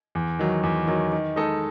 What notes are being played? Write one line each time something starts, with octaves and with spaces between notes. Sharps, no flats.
E2
D#3 F#3
E2
D#3 F#3
D#3
G#3 D#4 A4 D#5